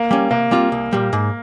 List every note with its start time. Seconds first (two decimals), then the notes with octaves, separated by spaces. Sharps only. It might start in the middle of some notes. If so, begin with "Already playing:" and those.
Already playing: A#3
0.11 G3 C#4
0.31 C3 A#3
0.51 G3 C4 F4
0.72 C2
0.93 A#2 G3
1.13 G#2